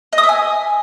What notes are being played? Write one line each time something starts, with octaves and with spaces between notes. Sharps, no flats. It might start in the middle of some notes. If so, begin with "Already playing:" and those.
D#5
D#6
E5
G#5